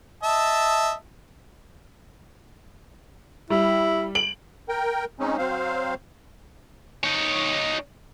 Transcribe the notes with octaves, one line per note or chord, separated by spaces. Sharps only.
D#5 E5 A5
G3 E4
D7 F#7
A#4 G5
G#3 C4 C#4 D#4
F#3 C4 C5 F5
D#4 C#5